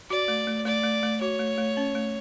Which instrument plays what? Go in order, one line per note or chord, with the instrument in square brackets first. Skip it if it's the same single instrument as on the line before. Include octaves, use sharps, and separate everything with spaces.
[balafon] F#4 [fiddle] D5
[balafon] A3
A3
[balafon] A3 [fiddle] D5
[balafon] A3
A3
[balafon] F#4 [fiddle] C#5
[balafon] A3
A3
C#4
A3